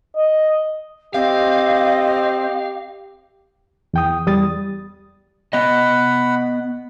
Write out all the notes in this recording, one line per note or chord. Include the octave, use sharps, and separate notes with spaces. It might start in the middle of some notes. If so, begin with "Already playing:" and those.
D#5
C4 G4 D#5 F5
E2 G5 D#6
E2 G3 D#6 A6
B3 D#5 F#5 B5